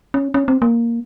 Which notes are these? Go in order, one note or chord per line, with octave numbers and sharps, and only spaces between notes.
C#4
C#4
C4
A#3